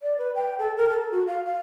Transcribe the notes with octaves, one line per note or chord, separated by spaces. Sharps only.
D5
B4
G5
A4
A#4
A4
F#4
F5
F5